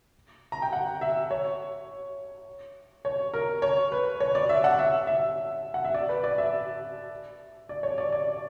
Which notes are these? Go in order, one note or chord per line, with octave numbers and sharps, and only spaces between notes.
A#5
G5
F#5
E5
C#5
C#5
A#4
C#5
B4
C#5
D5
E5
F#5
E5
E5
F#5
E5
D5
B4
D5
E5
D5
C#5
D5
D5